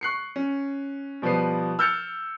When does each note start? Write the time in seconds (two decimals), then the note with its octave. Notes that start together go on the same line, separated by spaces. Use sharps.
0.01 C#6 F#6 C7 C#7
0.36 C#4
1.22 B2 F3 G3 B4 C7
1.79 E6 F6 G6 A6 C#7 F7